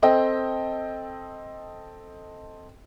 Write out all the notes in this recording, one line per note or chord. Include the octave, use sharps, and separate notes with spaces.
C4 A4 D#5 G5